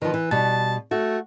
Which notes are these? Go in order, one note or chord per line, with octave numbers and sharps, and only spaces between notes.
D#3 F3 B4
E3
B2 G3 A5
A3 F#4